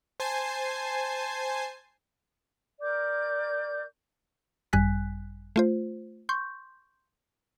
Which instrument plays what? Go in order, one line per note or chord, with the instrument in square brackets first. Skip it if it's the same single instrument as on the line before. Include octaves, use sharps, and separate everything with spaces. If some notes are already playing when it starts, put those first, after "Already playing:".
[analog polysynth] C5 G#5 A5 C7
[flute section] A#4 D5 D6 G6
[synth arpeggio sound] G#1 F#2 G3 G#5 F#6 B6
A3 F4 C5
C6 C#6 G6